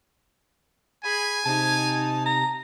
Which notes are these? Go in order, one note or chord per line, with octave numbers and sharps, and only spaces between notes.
G#4 G#5 B5
C3 D#4 A5
A#5